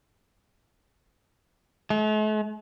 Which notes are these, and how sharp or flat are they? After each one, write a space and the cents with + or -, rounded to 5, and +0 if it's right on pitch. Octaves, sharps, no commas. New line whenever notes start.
A3 -45